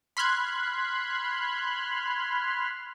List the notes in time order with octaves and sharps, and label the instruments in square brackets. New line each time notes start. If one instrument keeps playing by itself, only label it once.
[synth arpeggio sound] B5 C6 F6 F#6 G#6